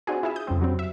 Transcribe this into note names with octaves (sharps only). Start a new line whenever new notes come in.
C4 D4 D#4 F#4 G#4
E4 F4 G#4 E5
D#6 G6
F2 C#3 G3 C4
G2 F#3 G3 C4
E5